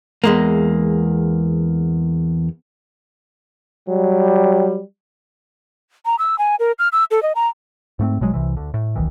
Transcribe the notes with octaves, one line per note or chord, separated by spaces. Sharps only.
E2 G#3 A#3
F#3 G3
A#5
E6
G#5
A#4
F6
E6
A4
D#5
A#5
G#2 A3 A#3 C4
A#1 B2 F#3 G#3
C2 C3 E3
D2 D3
A2
D#1 B1 D#3 E3